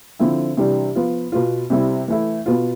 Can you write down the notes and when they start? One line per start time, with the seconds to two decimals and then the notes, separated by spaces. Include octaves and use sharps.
0.20 D3 F3 C4 E4
0.57 C3 E3 G3 D4
0.95 F3 B3 F4
1.32 B2 B3 F4
1.70 C3 G3 C4 E4
2.08 E3 A3 E4
2.46 B2 B3 F4